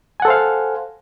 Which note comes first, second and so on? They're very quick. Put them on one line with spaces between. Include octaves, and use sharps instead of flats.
G#5 F#5 A4 C5 F5